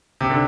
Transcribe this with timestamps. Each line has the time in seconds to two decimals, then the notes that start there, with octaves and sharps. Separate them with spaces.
0.21 C3
0.30 D3